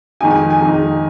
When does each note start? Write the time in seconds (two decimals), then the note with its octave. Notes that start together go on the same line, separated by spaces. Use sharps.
0.21 F2 D#3 G#3 D#4 G#5
0.31 G#5
0.50 G#5
0.60 F2 D#3 G#3 D#4